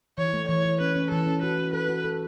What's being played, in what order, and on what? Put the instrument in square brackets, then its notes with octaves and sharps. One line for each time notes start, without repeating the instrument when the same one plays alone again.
[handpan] E3 [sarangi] C#5
[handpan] A3
[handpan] E3 [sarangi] C#5
[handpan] E3
[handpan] C#4 [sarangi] B4
[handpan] C#4
[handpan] E3 [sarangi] A4
[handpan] C#4
[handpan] F#4 [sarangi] B4
[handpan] F#4
[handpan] A4 [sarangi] B4
[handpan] F#4
A4